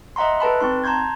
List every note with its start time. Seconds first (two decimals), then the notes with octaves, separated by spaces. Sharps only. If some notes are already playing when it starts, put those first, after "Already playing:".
0.16 D#5 E5 F#5 A#5 C6
0.40 A4 B4 A5 B5
0.60 C4 D#4 C6
0.84 A5 A#5 C6 G6 G#6